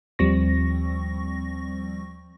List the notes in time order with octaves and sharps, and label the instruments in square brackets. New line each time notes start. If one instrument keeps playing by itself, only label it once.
[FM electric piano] D#2 F3 G3 C4 C#6 A#6